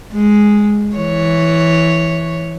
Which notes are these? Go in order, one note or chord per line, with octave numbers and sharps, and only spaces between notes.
G#3
E3 C#5